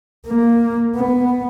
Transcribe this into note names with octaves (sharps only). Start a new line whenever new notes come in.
A#3
B3